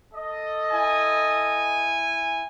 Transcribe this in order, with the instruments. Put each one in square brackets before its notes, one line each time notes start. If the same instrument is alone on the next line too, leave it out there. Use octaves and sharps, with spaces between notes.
[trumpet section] A4 D#5
[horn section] E4 G#5